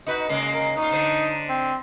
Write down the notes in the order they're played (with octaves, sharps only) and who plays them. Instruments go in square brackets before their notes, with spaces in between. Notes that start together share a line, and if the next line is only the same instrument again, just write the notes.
[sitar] D#4 F#4 B4
C#3 G#3 A#3
[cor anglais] A#4
[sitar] A#2 F4 [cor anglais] D#4
[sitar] D3 D4 C5
[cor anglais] C4